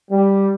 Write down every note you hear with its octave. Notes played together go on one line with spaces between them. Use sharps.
G3